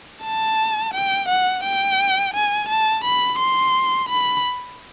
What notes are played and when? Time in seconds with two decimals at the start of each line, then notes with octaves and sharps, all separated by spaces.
0.24 A5
0.94 G5
1.29 F#5
1.64 G5
2.34 G#5
2.69 A5
3.04 B5
3.39 C6
4.09 B5